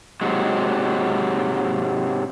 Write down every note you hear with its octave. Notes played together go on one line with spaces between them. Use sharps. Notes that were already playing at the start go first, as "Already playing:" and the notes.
G#2 C3 F#3 G#3